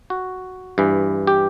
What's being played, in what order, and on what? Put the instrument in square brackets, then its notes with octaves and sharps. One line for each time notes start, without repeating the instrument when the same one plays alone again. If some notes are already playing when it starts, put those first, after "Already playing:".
[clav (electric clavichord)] F#4
G2 E3
G4